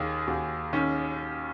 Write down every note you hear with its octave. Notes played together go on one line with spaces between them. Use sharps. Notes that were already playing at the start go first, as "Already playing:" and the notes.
Already playing: D#2 D#3 G#4
D#2 F#4
D#3 C#4